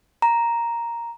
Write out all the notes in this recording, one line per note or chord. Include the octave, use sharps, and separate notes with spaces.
A#5